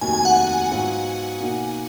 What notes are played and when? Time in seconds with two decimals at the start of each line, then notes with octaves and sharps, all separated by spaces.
0.01 F1 D#2 D#3 F#3 G#5
0.13 G#5
0.25 F#5
0.36 F#5
0.71 G#2 F#3 B3 F4
1.41 B2 A#3 D#4 F#4